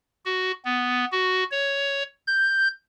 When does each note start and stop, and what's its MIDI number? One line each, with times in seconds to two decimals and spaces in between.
0.25 0.51 66
0.65 1.05 59
1.12 1.43 66
1.51 2.03 73
2.27 2.68 91